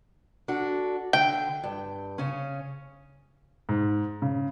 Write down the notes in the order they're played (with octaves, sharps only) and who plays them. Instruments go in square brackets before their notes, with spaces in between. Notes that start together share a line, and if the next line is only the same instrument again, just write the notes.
[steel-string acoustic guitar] D4 F#4 A4
[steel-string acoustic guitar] D3 [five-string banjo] G5
[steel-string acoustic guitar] G2
C#3 C#4
[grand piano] G#2
C#3